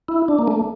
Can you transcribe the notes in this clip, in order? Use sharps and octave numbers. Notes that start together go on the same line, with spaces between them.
E4
D4
A#3
A3